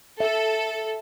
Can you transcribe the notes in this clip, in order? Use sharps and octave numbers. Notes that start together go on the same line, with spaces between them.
A4 E5